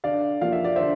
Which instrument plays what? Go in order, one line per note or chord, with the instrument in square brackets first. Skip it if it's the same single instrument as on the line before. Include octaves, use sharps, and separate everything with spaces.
[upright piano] D3 D5 F5
F3 A#3 D4 F4 F5
E5
D5
D3 C5 E5